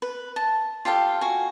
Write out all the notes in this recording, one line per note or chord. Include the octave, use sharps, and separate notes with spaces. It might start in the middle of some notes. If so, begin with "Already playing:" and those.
B4
A5
F4 G4 A4 F5
F#4 G#5